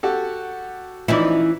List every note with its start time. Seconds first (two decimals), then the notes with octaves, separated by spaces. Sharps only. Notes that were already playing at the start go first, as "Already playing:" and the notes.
0.03 F#4 G4 A4
1.08 E3 F3 C#4 D#4 E4 D5